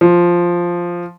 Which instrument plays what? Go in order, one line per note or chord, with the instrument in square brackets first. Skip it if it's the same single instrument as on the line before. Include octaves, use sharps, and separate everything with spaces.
[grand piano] F3